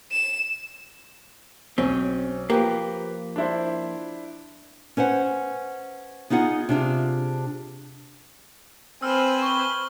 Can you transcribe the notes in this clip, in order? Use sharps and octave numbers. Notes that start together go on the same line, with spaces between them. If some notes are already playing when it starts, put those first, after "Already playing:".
E7
B1 C4 C#4
F3 A#3 G4 B4 G5
D4 E4 C5
C#4 B4 C5 F#5
B3 D#4 F4 G#4 F#5
C3 D4 F4 G#4
C4 B4 C5 G#5 E6 F6
C#6 G7